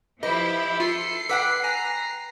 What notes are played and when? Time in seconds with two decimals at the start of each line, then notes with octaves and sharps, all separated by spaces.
0.23 F3 E4 G4 B4 D#5
0.80 F4 A4 C7
1.29 B4 F#5 G5 D6 E6 B6
1.64 G#5 A#5